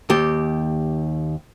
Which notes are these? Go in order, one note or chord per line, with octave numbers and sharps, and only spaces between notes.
D#2 G4